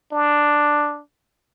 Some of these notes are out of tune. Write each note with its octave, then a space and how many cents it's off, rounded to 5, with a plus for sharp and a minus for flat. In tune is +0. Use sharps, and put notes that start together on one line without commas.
D4 +5